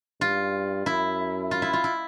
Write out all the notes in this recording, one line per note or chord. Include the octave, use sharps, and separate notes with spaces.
G2 F4
F#2 E4
F4
E4
F4
E4